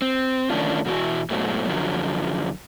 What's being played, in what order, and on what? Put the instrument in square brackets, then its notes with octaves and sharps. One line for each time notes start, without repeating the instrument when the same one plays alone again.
[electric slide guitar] C4
D#3 E3 A3 C#4 D4 F4
B2 E3 E4 F#4
G#2 B2 F#3 A3
F#2 D3 F3 F#3